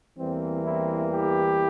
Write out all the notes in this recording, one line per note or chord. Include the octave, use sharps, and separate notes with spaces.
E2 E3 G3 A#3 C4
C4 E4
E4 G4